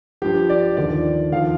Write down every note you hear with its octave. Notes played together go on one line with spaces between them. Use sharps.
G2 F3 G4
D5
D#2 D3 F3 D5
D#2 D3 F3 F5